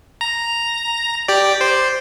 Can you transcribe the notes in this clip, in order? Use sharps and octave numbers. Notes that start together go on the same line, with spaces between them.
A#5
G4 D5
C5